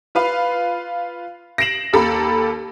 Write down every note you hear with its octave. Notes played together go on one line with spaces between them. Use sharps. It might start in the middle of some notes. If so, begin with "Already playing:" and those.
F4 B4 F5
A#6 C7 D7 E7 F#7
D#2 G4 A4 A#5 B5